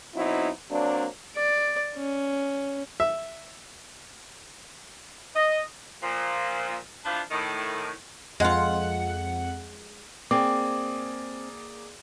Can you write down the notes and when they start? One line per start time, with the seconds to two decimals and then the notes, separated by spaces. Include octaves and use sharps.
0.15 B2 F#3 C4 D#4 E4
0.70 F#3 A#3 C4 D4
1.36 D5
1.97 C#4
3.00 E5
5.35 D#5
6.03 A#2 F3
7.05 E3 F3 D4 F4 B4 D5
7.31 A2 D#3
8.40 F2 G#3 F4 F#5
10.31 A#3 C4 G#4 D5 D6